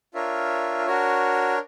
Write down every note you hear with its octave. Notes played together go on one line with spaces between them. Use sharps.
D4 F4 A#4 C#5 E5
D4 F#4 A#4 C#5